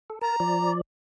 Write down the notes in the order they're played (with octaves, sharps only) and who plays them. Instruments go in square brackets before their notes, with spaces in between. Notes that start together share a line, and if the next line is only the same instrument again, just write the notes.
[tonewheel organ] A4
[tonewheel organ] A#4 A5 [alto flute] A#5
[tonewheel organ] F3 D5